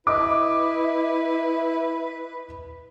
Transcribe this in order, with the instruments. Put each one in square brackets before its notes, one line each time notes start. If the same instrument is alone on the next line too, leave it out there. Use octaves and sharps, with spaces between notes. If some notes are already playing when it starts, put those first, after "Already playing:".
[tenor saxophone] E4 [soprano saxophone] B4 [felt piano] D#5 D6 D#6